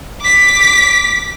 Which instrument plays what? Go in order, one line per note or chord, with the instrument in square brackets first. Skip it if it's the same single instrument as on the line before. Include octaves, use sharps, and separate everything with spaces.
[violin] D6 B6